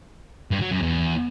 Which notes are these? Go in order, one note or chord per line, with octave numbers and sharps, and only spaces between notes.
G2
F#3
F#2
E2